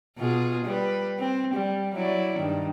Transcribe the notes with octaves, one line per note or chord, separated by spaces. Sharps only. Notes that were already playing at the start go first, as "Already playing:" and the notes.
B2 F4 G#4
G3 B4
C4
G3
F#3 E4 D5
G2 D#3